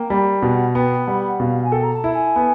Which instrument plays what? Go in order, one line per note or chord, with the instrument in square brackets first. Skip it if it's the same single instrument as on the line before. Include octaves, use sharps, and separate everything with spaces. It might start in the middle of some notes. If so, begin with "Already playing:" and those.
Already playing: [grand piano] A#3 [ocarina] G5
[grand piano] G3
[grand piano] B2 [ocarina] F#5
[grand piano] B3 [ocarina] G5
[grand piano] G3 [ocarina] F#5
[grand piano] B2 [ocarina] F5
[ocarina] G#5
[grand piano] A4 [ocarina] G5
[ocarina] A#5
A5
[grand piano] E4
[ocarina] G#5
[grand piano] B3